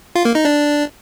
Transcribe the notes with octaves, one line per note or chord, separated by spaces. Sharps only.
F4
A#3
D#4
D4